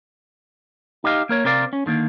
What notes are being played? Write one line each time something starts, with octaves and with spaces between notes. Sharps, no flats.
D#4 G4 D#5 F5
A#3 A#4 C#5
C3 C4 A#4 D5 F5
C#4
D3 D#3 A#3